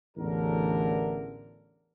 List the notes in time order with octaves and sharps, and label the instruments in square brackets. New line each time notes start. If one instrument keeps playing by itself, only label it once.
[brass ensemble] A1 E2 D3 A#4